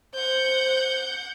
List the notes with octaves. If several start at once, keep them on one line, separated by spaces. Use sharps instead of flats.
C5 F#5 G6